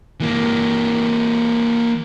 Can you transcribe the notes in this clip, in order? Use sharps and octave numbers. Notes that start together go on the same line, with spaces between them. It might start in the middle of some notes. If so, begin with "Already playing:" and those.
E3 A#3